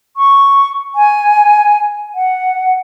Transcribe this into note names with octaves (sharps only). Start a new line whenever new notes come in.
C#6
G#5
F#5